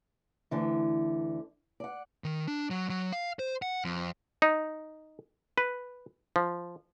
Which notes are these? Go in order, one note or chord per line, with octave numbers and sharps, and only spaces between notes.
D2 D3 E3
D5 F#5
D#3
D4
F#3
F#3
F5
C5
F#5
F2
D#4
B4
F3